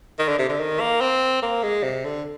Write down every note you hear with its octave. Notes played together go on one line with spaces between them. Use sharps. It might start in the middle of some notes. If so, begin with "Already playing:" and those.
D#3
D3
C3
D3
D#3
A#3
C4
A#3
G#3
C3
D3